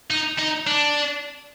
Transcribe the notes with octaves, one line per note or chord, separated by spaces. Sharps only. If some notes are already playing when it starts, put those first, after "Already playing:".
D#4
D#4
D4